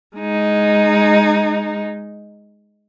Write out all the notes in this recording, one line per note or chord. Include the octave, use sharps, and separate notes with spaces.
G#3 D#4